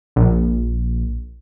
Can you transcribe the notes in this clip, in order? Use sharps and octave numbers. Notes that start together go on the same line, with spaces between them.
A#1